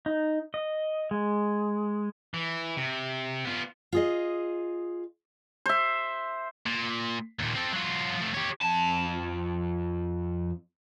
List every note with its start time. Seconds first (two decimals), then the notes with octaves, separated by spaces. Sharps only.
0.06 D#4
0.54 D#5
1.11 G#3
2.34 E3
2.77 C3
3.45 B3 F4
3.92 F4 G#4 D#5
5.66 C5 E5
6.67 A#2
7.39 D#2 A#2
7.55 C4 A4
7.73 F#3 F4
8.18 F3 A3
8.34 G4 C#5
8.61 F2 A5